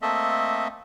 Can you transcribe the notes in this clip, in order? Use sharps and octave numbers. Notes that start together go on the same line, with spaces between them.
A3 A#3 C4 A4 D#5 E5